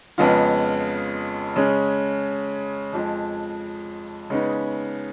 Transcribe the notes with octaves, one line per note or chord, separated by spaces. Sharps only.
F2 C#3 G#3 B3 F4
C#3 G#3 C#4
F2 F3 G#3
C#3 G#3 B3 D#4